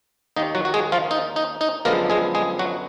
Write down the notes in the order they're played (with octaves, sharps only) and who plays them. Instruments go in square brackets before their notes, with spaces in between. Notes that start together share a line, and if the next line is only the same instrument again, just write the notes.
[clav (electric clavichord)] D#2 D#3 A#3 D#4
F#3 F#4
F#4
G#3 G#4
F3 F4
D#4
D#4
D#4
F#2 D3 F3 G#3 A#3 B3 A#4
G#3 G#4
G#3 G#4
F#3 F#4